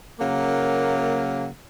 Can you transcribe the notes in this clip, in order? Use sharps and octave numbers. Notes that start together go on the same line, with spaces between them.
C#3 F#3 A#3